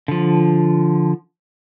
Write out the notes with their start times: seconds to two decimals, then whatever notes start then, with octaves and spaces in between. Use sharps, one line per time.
0.08 D3 F3